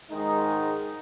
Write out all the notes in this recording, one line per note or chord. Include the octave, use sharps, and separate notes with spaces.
G#2 D#3 G#3 D#4